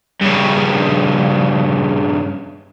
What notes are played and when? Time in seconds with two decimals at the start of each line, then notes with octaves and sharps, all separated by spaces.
0.21 G2 C#3